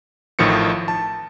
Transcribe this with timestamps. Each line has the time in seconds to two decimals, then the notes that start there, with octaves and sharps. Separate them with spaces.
0.39 A1 A2 D#3 F3 C#7
0.88 A5